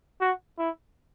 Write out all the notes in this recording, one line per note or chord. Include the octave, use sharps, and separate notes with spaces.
F#4
E4